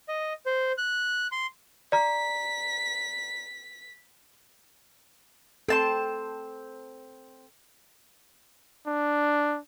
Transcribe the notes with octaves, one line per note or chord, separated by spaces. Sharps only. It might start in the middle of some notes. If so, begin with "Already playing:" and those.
D#5
C5
F#6
C6
D5 A#5 B6
C4 A4 A5 C6
D4